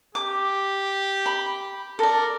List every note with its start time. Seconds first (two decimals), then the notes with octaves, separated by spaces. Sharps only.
0.15 G4 D6
1.26 B5
1.99 A4 A#4 D5